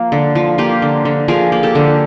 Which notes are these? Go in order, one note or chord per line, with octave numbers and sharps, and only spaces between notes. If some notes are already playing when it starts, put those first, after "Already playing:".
Already playing: F3 A#3
D3
F3
A#3 F4 G4
D3
D3
F3 G#4 A#4
A#3
G4 A4
D3